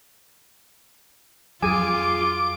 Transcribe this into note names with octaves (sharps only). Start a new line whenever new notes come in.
F2 F#3 F4 G#4 G#5 D6